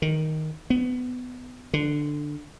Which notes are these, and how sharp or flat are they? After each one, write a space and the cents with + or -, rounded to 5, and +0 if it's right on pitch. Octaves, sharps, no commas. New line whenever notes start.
D#3 +5
B3 +20
D3 +10